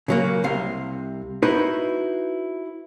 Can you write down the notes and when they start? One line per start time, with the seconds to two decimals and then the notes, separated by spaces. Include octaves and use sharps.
0.08 C#3 F#3 A#3
0.44 C2 C3 F5
1.43 D#4 E4 F#4 B4 C5 D#5